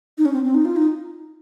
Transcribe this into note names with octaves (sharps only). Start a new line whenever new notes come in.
D#4
C#4
C4
C4
D#4
F4
D#4